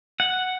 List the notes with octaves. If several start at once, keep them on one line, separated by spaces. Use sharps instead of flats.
F#5